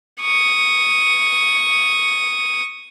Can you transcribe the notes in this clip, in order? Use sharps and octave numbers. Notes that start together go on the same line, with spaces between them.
C#6 D#6